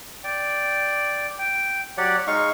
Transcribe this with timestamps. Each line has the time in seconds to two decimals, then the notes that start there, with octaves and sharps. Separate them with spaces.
0.24 D5 G5
1.39 G5
1.97 F#3 G4 D5 F#5
2.27 G#3 D#4 F5 C#6